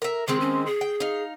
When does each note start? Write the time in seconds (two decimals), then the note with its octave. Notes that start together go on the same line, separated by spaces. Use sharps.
0.02 A#4 E5
0.28 D#3 G#3 C4 G#4
0.40 C#4
0.66 G#4
0.81 G5
1.00 D#4 F5